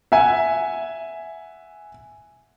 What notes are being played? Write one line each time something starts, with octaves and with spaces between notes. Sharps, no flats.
E5 F#5 G#5